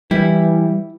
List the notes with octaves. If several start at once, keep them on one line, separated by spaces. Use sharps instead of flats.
E3 G3 E4